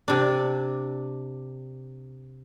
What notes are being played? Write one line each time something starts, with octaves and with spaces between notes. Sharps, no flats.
C3 D4